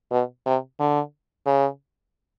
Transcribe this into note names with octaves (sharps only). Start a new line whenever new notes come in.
B2
C3
D3
C#3